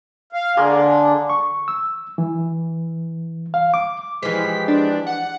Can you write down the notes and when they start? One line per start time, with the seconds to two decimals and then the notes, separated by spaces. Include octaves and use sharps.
0.33 F5
0.57 D3 G#3 A#3 D4
1.30 C#6
1.68 E6
2.18 E3
3.54 F5
3.74 D6
4.23 E3 F3 G#3 G4 B6
4.68 D4
5.07 F#5